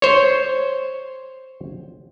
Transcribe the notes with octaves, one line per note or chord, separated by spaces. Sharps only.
C5 C#5